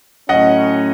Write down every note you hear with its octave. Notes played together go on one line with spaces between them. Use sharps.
A2 F#3 C#4 D#5 F#5